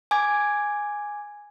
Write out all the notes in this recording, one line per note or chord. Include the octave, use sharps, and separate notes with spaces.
G#5 D6 G#6